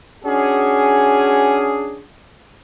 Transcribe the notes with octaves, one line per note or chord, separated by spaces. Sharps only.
C#4 D4 F#4 G#4